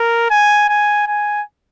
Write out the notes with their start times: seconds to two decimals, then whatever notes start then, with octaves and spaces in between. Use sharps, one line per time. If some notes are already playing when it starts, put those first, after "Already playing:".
Already playing: A#4
0.30 G#5
0.69 G#5
1.07 G#5